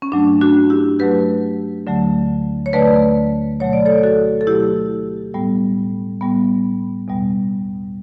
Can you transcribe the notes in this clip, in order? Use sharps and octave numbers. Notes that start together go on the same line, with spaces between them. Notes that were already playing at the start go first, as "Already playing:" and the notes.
C#4
G2 F#3 A3 D4
D4 F#4
E4 G4
G2 F#3 A3 G4 B4
D2 D3 F#3 A3
C#5
D2 D3 F#3 A3 B4 D5
B2 F#3 A3 C#5
D5
A4 C#5
F#4 A4
A4
B2 F#3 A3 E4 G4
A2 G3 B3
A2 G3 B3
E2 B2 G3 B3